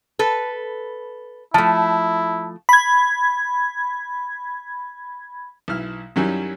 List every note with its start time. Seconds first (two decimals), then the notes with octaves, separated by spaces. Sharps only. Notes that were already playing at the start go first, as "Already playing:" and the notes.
0.19 A4 B4
1.54 F3 A3 E4 A5
2.69 B5 G#6
5.68 B1 E4 F6
6.16 F#2 D#3 F#3 G3 C#4 E4